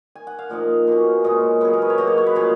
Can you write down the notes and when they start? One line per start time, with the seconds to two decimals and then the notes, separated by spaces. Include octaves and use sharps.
0.15 G#5
0.27 F#5
0.39 F5
0.49 A#2 F3 A#3 D#4 D#5
0.87 B2 A#3 C#4
1.24 A#2 G#3 C#4 D#5
1.61 C#3 F#3 B3 G#4
1.73 A#4
1.82 B4
1.90 C#5
1.98 B2 F#3 A#3 D#5
2.07 C#5
2.18 C#5
2.27 B4
2.35 A#2 F3 G#3 C#4